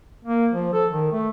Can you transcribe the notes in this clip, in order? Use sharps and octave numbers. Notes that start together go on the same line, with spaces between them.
A#3
F3
A4
D#3
A3